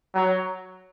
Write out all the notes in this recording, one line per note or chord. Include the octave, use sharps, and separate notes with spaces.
F#3